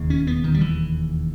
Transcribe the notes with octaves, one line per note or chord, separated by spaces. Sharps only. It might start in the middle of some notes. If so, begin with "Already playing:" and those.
Already playing: E1 D#2 C#3
C#4
B3
D#3
G3
E3